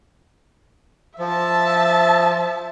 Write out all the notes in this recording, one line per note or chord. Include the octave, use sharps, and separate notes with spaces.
F3 E5 A5